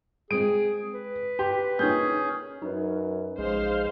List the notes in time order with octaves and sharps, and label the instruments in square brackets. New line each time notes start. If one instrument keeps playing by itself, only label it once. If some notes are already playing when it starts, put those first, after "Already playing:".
[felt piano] G#3 C4 [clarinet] G#4 [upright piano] D7
[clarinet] B4
[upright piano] G4 [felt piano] C6
[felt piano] A#3 D#4 [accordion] C#4 G#4 [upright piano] G6
[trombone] F#2 [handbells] D#4 B4
[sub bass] A#1 [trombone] G#3 [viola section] C5 F5